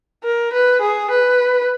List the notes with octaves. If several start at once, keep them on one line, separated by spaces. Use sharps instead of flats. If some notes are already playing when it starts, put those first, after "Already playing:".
A#4
B4
G#4
B4